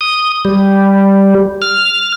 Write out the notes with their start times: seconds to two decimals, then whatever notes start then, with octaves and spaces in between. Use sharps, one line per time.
0.01 D#6
0.45 G3
1.62 F6